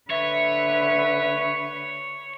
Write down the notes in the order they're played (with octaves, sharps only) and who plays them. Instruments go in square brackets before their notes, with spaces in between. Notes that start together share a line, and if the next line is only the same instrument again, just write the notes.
[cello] D3 B4 [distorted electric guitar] C#5 [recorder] E5